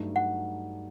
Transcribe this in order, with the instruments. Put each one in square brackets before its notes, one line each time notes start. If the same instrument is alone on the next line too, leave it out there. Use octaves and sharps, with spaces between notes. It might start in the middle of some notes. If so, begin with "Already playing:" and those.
Already playing: [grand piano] G2 F#3 A3 D#4
[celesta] F#5